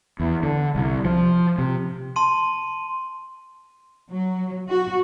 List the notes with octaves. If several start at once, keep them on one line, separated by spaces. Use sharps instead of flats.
E2
D3
C2
F3
C3
A5 C6 D#7
F#3
F#4